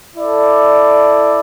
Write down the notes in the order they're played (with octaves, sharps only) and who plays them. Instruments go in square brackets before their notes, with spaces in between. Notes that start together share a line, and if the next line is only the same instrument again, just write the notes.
[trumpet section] E4 A4 D5